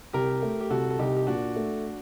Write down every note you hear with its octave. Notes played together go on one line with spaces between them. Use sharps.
C2 G4 A#4
A3
G4
C2 F#4 A4
A4
C2 D#4 G4
G4
A#2 D4 F#4
A3